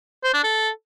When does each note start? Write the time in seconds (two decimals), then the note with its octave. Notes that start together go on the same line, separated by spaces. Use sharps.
0.24 C5
0.34 D4
0.43 A4